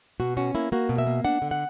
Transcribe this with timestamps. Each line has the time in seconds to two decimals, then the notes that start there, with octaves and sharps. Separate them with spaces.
0.20 B2 F#4
0.37 C#4 F#4
0.55 A#3 E4
0.72 A#3 F#4
0.89 B2
0.98 E5
1.07 A#3
1.25 D4 F#5
1.42 D3
1.51 F#5